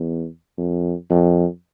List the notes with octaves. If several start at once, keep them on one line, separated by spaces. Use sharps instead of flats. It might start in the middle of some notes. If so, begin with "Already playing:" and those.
Already playing: E2
F2
F2